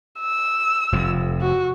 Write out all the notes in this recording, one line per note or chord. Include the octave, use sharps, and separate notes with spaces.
E6
F1 F2
F#4